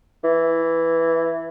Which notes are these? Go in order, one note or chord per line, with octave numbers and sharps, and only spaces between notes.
E3